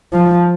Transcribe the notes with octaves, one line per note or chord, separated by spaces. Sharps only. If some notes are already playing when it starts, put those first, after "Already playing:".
F3